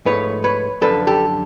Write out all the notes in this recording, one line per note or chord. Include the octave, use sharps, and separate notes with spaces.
G#2 F3 A3 B4 C#5
B4 C#5
F#2 D3 F3 A4 B4
G4 A4